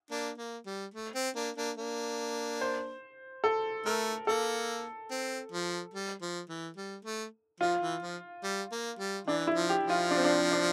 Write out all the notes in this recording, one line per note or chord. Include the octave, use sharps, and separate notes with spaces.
A#3 D4
A#3
G3
A3
C4
A#3 D4
A#3 D4
A#3 D4
C5
A4
A3 A#4
A#3 A4
C4
F3
G3
F3
E3
G3
A3
F3 F4
E3
F3
G3
A#3
G3
E3 D4
E4
F3
G4
F3
F4
D4
C4
D4
D4